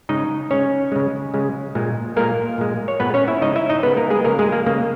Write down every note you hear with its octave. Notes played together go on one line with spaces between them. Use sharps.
C#3 G#3 D#4 D#5
C#3 G#3 C#4 C#5
C#3 G#3
C#3 G#3
A#2 G#3
A#2 G#3 A#3 A#4
A#2 G#3
C#5
A#2 G#3 B3 B4
C#4 C#5
E4 E5
C#3 G#3 D#4 D#5
E4 E5
D#4 D#5
C#3 G#3 B3 B4
A#3 A#4
G#3 G#4
C#3 G#3 A#3 A#4
G#3 G#4
A#3
C#3 G#3 A#3